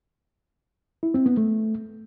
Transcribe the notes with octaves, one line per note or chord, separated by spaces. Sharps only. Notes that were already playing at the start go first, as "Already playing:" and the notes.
E4
C4
B3
A3